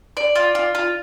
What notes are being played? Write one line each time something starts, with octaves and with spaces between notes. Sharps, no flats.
D5
F4
F4
F4